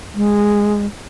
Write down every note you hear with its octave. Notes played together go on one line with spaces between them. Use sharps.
G#3